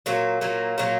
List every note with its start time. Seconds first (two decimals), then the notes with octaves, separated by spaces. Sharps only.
0.06 A#2 F#3 A#3
0.41 A#2 F#3 A#3
0.78 A#2 F#3 A#3